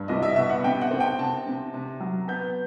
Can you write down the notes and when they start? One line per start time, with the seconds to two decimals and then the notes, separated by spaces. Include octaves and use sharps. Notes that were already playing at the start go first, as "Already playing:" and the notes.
Already playing: G2
0.08 C2 D#5
0.23 E5
0.36 B2 E5
0.49 F#5
0.64 C3 G5
0.81 F#5
0.91 C4
1.00 G5
1.19 C3 A5
1.47 C3
1.74 C3
2.00 F#3
2.28 B3 G6